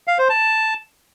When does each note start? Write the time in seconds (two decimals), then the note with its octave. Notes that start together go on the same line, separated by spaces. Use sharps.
0.08 F5
0.19 C5
0.30 A5